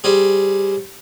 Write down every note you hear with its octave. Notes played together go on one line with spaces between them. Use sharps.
G3 C4 G#4